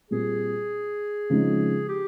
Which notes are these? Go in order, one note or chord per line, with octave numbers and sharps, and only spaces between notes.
A#2 G3 C4 G#4
C#3 F3 G#3 C4 D#4
G4